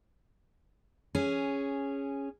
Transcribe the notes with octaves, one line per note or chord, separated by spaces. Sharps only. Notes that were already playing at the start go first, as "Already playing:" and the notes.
C#4 G#4